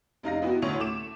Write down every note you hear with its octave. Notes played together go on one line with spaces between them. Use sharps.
F1 D#4 F5 A#6
B3 E4 F#4 G4
D2 A2 C#5 C#6 F7
A3 D6 E7